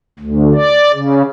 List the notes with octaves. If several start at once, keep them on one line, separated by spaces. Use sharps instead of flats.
D2
D5
C#3